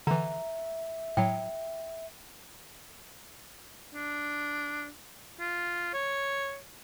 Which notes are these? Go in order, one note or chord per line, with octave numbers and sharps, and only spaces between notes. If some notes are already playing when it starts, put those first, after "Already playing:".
D3 E3 E5 A#5
A2 F#3 G5
D4
F4
C#5